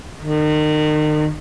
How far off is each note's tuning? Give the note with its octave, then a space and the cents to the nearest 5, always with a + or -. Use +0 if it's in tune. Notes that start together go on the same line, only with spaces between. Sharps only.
D#3 -35